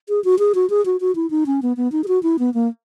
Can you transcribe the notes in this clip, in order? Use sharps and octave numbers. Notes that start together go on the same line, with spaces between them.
G#4
F#4
G#4
F#4
G#4
F#4
F#4
E4
D#4
C#4
B3
B3
D#4
G#4
F#4
E4
B3
A#3